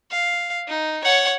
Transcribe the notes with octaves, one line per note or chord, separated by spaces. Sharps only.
F5
D#4
C#5 F#5